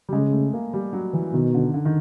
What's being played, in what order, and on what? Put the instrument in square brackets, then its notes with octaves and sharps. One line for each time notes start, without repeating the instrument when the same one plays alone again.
[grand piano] G3
[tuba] C#3 [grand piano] G#3
[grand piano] A3
A#3
G3
F#3
E3
[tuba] B2 [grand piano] D#3
[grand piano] D3
D3
D#3